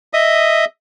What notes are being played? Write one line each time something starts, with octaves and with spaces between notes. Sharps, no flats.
D#5 E5 D#6